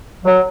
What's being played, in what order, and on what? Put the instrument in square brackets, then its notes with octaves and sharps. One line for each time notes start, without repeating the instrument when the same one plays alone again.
[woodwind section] F#3